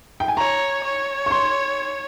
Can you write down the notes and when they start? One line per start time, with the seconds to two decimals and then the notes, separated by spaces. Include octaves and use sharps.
0.20 G5
0.28 G#5
0.37 C#5 A#5
0.84 C#5
1.26 C#6
1.31 C6